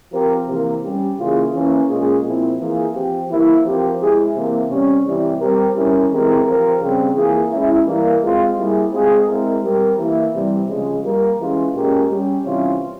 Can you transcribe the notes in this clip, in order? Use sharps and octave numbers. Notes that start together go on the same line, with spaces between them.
F3 C4 G4 A#4
C3 E3 A#3
G3 C#4 G4
C#3 E3 A#3 F4 G#4
E3 A#3 C#4
A#2 G#3 C#4 F4 G#4
A#2 F3 C4 E4
E3 A#3 F4 G#4
F3 C4 G4
E3 A#3 E4 A#4
F3 C4 G4 A#4
G#3 E4 G#4
C3 E3 A#3
C3 G3 C#4
C3 E3 G3
G3 C4 G4 A#4
G3 C#4 E4 A#4
E3 G#3 C4 G4 A#4
F3 C4 G4 A#4
C#3 G3 C4
E3 A#3 F4 G#4
G#3 C#4 E4
E3 G3 A#3
G#3 C4 F4
G3 A#3 E4 G#4
G#3 C4 F4 G#4
G#3 C4 E4 A#4
G3 C4 G4 A#4
E3 A#3 E4
C3 E3 G3
C#3 F3 G#3
G3 A#3 F4 A#4
E3 G#3 C#4 F4
A#2 G#3 C#4 G4 A#4
G3 C#4 G4
C3 E3 G3 C#4 F4